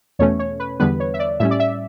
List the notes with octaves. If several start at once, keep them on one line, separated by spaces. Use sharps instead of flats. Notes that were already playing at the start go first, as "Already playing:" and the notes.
E2 B2 A3 C#4 C#5
C#5
B4
E2 D3 G3 B3 B4
C#5
E5
D5
A2 G3 C#4 E5
D5
E5